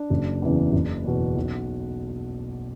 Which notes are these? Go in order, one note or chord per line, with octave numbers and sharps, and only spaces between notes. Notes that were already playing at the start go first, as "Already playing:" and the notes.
Already playing: D4
F#1
E2 C#3 E3
F#1
E2 B2
B1